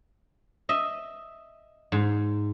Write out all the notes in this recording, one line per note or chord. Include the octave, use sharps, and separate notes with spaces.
D#5 E5
G#2